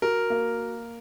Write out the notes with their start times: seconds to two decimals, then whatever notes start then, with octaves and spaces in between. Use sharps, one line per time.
0.02 F#4 A#4
0.30 A#3